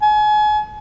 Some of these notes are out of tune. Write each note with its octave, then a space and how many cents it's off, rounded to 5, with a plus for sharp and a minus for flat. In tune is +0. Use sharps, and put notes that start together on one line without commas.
G#5 +35